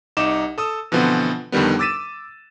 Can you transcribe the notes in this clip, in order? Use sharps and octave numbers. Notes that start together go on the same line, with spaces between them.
C2 D#4 D6 E7
A4 D#6 E6
B2 D3 E3 F3 B3 C4
F2 D3 D#3 G3 B3
D6 E6 A6 B6 D#7 E7